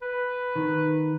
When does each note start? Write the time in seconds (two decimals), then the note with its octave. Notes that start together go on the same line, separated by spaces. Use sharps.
0.02 B4
0.56 D#3